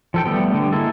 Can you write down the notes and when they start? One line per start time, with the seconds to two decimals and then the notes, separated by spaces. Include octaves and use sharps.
0.14 F3 A4 G5
0.26 G3 A3 B3 G4
0.54 D3
0.72 G#3 A#3 E4 A4